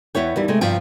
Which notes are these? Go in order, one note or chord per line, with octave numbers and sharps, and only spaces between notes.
E2 B3 E4 C#5 G5
D#2 E3 G3
C3 G#3 A3
G2 C3 F3 G5